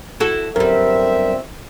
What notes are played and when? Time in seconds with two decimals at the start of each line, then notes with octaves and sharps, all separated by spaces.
0.20 E4 F#4 A4
0.56 G1 F#2 G3 C4 A#4 E5